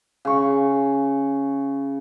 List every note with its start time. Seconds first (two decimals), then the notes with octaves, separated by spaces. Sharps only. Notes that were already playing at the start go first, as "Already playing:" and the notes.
0.25 C#3 C#6